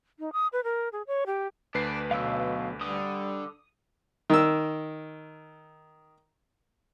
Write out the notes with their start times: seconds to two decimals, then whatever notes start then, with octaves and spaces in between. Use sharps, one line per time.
0.19 D#4
0.33 D#6
0.53 B4
0.64 A#4
0.92 G#4
1.07 C#5
1.26 G4
1.74 D2 D4 B4 C7
2.11 B1 B2 F5 E6
2.81 D3 G3 D#6
4.30 D#3 E6